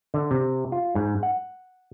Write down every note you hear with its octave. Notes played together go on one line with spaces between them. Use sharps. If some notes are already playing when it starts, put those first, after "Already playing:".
D3
C3
F4
G#2
F#5